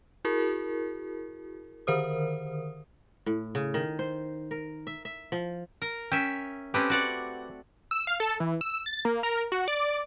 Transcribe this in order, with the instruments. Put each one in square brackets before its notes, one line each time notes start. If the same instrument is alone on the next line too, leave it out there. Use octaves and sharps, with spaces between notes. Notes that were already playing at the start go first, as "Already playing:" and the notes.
[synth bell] E4 F#4 G#4 A#4
D3 D#3 A#4 C5 D#6
[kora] A2
C#3
D#3
C5
A#4
E5
E5
F3
[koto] A#4
[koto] C#4 E5 [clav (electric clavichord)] G5
[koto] A3 C4 C#4 [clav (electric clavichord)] G4 B4
[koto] F#4 D5 F#5
[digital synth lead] E6
F5
A4
E3
E6
A6
A#3
A#4
F#4
D5